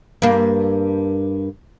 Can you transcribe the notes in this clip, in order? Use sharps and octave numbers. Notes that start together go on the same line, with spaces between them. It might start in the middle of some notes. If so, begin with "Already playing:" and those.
G2 A#3